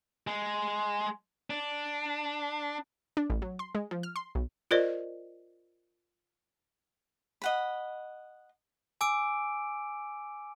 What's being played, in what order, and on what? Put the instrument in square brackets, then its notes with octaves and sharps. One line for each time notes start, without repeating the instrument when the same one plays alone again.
[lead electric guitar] G#3
D4
[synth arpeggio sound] D4
A1
F#3
C6
G#3
F3
F6
C6
B1
[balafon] F4 A#4 C5 D5 D#5
[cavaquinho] D#5 F#5 B5
[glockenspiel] G#5 D6 E6 D7